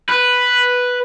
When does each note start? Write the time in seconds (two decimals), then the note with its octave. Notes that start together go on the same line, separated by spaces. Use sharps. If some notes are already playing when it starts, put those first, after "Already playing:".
0.09 B4